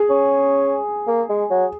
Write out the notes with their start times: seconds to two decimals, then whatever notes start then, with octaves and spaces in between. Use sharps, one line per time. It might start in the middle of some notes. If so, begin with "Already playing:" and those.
Already playing: G#4
0.10 C#4
1.07 A#3
1.29 G#3
1.50 F#3